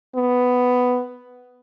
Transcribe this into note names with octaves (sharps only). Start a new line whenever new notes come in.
B3